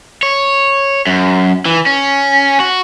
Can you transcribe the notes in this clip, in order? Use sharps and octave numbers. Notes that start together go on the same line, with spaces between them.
C#5
F#2
E3
C#4
F#4